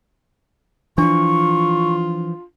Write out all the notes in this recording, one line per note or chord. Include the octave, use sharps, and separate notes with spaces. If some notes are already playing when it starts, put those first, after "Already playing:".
E3 F3 D4 F4 C#6